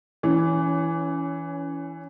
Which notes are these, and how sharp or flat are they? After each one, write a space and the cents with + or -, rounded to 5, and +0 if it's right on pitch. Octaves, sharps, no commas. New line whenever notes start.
E3 +0 C#4 +25